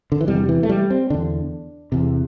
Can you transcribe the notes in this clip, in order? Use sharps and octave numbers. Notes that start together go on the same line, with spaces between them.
D3
E3
E2 C3 G3
E3
A3
G3
C4
E2 D3 D4
E2 C3